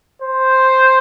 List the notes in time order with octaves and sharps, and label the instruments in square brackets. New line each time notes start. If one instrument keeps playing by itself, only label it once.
[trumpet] C5